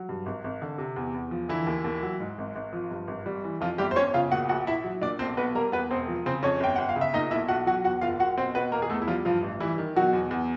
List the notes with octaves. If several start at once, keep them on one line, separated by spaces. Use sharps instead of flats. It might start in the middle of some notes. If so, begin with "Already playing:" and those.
Already playing: F#3
G2
G#1
G#1
D3
C3
E2
E2
F3
D3 E3 E4
D#2
D#2
F#3
G#2
G#1
G#1
F3
G2
G#1
G3
E3
F2 F3 F4
G1 G3 G4
C5
G1 C#4 C#5
C#3 F4 F5
A#2 F#4 F#5
A#1 F#4 F#5
A#1 E4 E5
F#3
A#2 D4 D5
B1 C4 C5
B1 B3 B4
G3 A#3 A#4
E2 B3 B4
E1 C4 C5
F3
C#3 C4 C5
F2 C#4 C#5
G1 G5
G1 F#5
F5
C#3
E5
A#2 D#4 D#5
B1 E4 E5
B1 F#4 F#5
F#3 F#4 F#5
E2 F#4 F#5
F#1 F4 F5
F#1 F#4 F#5
B2 C4 C5
B2 B3 B4
E2 A#3 A#4
G#4
E2 A3 A4
E4
F3 G3 F4
G2 F3 F4
A1
E3 G3 E4
D#3
B2 F#3 F#4
E2
E2